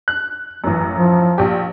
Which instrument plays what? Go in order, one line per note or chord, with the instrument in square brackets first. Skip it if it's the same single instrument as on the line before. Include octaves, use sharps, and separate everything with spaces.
[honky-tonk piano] F#6
[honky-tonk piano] A1 F#2 [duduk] E3
[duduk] F3
[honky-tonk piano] A#1 G4